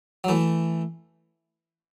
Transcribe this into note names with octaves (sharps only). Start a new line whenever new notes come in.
F#3
E3 A3